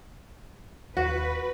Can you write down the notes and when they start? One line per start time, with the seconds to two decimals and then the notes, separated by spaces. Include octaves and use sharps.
0.97 D#2 F#4 B4